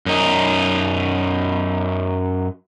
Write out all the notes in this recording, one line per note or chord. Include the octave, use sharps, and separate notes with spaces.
F#2 D#4